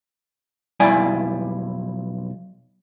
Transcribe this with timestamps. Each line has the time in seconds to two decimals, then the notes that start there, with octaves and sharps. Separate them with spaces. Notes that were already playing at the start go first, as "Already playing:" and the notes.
0.80 B1 F2 G3 E4 D5 G#5